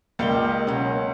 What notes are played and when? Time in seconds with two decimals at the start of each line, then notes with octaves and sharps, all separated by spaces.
0.19 C#2 G3 A#3 F5 G5
0.37 D#5
0.67 B2 F#3 C#4